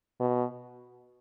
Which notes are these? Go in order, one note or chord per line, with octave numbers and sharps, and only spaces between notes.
B2